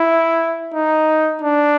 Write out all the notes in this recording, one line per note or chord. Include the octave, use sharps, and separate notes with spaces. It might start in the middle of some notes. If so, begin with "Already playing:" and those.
Already playing: E4
D#4
D4